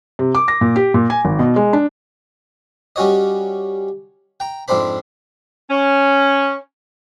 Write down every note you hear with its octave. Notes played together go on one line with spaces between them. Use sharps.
C3
D6
A#6
A#2
G4
A#2
G#5
G#1
B2
G#3
D4
G3 C#4 F#4 C#5 D#5
G5 A#5
F2 G#2 C4 D4 C5 B5
C#4